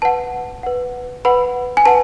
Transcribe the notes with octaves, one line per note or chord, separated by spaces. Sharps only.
B4 F#5 A5
B4 F#5
B4 F#5 B5
G#5
B4 F#5 A5